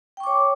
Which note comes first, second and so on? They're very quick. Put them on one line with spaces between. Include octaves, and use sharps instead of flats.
G5 C#6 D6 C#5